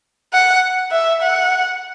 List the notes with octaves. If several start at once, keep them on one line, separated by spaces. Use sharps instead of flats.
F#5
E5
F#5